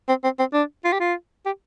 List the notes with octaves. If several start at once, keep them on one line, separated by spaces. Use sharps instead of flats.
C4
C4
C4
D4
F4
G4
F4
G4